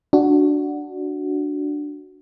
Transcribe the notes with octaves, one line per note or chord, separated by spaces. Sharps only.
D4 F#4